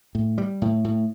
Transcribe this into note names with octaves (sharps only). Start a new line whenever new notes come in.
A2
G3
A2
A2